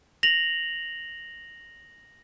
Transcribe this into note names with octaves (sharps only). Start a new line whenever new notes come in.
A#6 F7 F#7